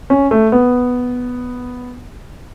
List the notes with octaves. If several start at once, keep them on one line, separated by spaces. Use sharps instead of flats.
C#4
A3
B3